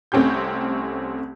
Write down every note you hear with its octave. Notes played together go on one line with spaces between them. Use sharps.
C2 A3 C4 C#4 G4 G6